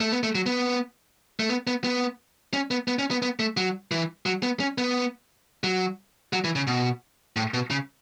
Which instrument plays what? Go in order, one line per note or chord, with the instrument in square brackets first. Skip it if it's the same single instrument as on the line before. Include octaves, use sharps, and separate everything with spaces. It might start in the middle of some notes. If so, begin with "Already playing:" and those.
[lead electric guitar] A3
B3
A3
F#3
B3
A3
B3
B3
B3
C#4
B3
B3
C#4
B3
B3
A3
F#3
E3
F#3
B3
C#4
B3
F#3
F#3
E3
C#3
B2
A2
B2
C#3